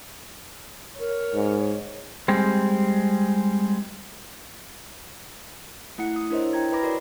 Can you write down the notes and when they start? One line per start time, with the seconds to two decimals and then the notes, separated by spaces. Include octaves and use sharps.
0.99 A#4 C#5
1.34 G#2
2.28 G3 G#3 C4
5.98 A3 E4 F#5 C#7
6.16 D#6
6.30 D4 E4 A#4 C5 C#5 D#5
6.53 E4 G5 A#5 G#6
6.72 B4 D#5 A#5 B5 D6 A#6
6.83 F#4 A#4 C#5 D5